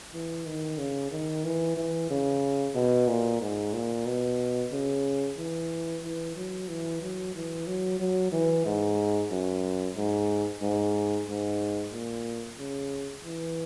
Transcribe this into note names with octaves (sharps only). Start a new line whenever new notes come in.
E3
D#3
C#3
D#3
E3
E3
C#3
B2
A#2
G#2
A#2
B2
C#3
E3
E3
F#3
E3
F#3
E3
F#3
F#3
E3
G#2
F#2
G#2
G#2
G#2
A#2
C#3
E3